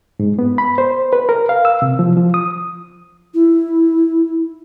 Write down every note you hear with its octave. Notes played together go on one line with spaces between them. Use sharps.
G#2
B3
B5
C5
B4
A#4
F5
E6
C3
F3
F3
D#6
E4